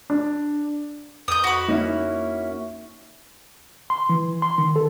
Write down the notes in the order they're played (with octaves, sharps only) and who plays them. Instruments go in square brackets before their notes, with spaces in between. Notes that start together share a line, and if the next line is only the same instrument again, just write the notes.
[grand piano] D4
[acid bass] F2 [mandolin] D#6 G6
[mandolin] F#4 B5
[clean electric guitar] A#3 C#4 E4 [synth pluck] D#4
[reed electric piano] C6
E3
C6
D#3
A4